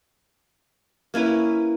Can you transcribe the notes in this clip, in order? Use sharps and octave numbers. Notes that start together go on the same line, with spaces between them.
A#3 C#4 E4 B4